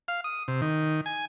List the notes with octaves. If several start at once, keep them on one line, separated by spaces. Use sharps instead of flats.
F5
D#6
C3
D#3
G#5